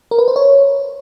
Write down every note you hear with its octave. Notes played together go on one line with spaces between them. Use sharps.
A#4
B4
C5
C#5